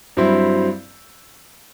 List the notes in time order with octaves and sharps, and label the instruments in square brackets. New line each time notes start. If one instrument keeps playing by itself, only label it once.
[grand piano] G2 F#3 C4 E4